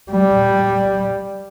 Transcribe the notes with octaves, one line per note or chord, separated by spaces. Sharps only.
G3